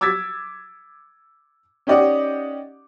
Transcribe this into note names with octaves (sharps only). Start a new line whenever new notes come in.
D6 E6 G#6 A6 B6
C#4 D#4 G4 D5 D#5 F#5